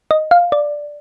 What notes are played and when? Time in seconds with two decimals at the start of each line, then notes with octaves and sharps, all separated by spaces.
0.11 D#5
0.31 F5
0.52 D5